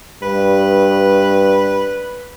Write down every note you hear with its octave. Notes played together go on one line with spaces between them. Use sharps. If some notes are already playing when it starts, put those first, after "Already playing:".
G2 B4